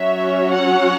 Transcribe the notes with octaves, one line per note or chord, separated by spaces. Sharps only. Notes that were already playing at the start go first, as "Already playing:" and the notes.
Already playing: F#3 C#4 F#4 C#5 E5
F#5